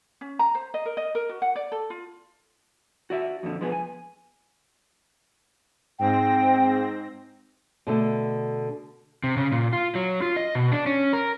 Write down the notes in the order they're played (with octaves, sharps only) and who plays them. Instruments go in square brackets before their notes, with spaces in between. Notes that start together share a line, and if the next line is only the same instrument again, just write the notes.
[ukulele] C#4
A#5
C5
D#5
A#4
D#5
A#4
F#4
F#5
D5
A4
F4
[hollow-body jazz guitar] F#4 D5 E5
F2 A#2 D3
F3 G#3 B3 G#4 B4
G#5
[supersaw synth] G#2 C4 A#6 [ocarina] G5
[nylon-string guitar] B2 D3 A3
[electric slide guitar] C3
C#3
A#2
F4
F#3
F4
D#5
B2
D4
C#4
A#4